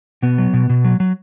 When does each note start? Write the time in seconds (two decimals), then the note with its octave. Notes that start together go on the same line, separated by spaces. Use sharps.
0.22 B2 B3
0.38 F#3
0.53 B2
0.70 B2
0.84 F#3
1.00 F#3